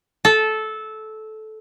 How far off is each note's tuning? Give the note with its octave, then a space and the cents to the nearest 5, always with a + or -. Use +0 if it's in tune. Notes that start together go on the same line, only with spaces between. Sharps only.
A4 -15